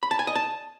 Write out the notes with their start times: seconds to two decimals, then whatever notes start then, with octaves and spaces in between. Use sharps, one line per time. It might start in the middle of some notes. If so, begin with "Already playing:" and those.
0.03 B5
0.11 A5
0.19 G#5
0.27 D#5
0.35 A5